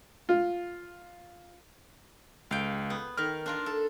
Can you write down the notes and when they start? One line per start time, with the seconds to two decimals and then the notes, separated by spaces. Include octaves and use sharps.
0.29 F4
2.51 C#2 F5 G5
2.90 B3
3.17 D#3 A#4 F6
3.46 D4 F4 A#4
3.66 A4